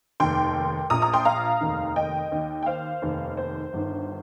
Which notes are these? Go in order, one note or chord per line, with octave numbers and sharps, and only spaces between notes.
F1 D#2 D#3 G5 C6
A#1 A#2 A#5 D#6
A#5 D#6
G5 C6
F5 A#5
F1 D#2 D#3
D#5 G5
D#2 D#3
G5
C5 F5
F1 D#2 D#3
C5
G1 G2 D#3